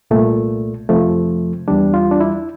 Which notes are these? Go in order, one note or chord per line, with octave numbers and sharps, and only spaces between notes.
C2 A#2 A3
F2 C3 F3 A3
E2 E3 G3 D4
F4
D4
E4